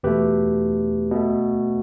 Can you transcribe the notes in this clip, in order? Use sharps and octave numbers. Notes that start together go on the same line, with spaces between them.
E2 B2 A3 G4 B4
B2 A3